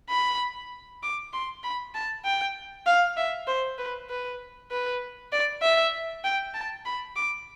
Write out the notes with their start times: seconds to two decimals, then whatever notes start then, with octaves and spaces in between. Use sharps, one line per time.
0.10 B5
1.03 D6
1.33 C6
1.63 B5
1.95 A5
2.24 G5
2.86 F5
3.17 E5
3.47 C5
3.78 B4
4.10 B4
4.71 B4
5.32 D5
5.62 E5
6.24 G5
6.54 A5
6.85 B5
7.16 D6